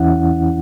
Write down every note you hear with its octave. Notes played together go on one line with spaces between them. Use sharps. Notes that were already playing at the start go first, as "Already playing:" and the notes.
Already playing: E2 E3 C#4 E4 F#5